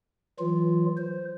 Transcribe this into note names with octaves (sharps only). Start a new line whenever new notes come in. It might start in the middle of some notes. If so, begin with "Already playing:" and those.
E3 F#3 F4
C5